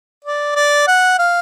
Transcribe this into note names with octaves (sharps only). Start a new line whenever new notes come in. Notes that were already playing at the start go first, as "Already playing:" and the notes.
D5
D5
F#5
F5